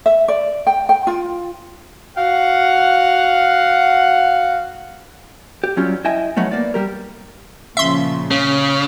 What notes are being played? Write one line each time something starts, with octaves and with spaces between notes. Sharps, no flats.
E5
D5
G5
G5
F4
F#4 F5 F#5
G4
F#3 G3 C#4 F4
E4 D#5 E5 G5 G#5
F3 F#3 A3 B3 D#4
A#3 B3 D5
G3 G4 A#4
A#2 C#3 F3 E5 C6
C#3 C#4